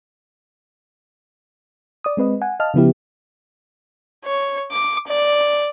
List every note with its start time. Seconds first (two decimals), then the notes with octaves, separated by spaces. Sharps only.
2.04 D5 D#6
2.17 G#3 C4 B4 D#5
2.41 F#5 G#5
2.60 D#5 F5 A5 F6
2.74 C#3 F3 B3 E4 G4
4.25 C#5
4.71 D6
5.07 D5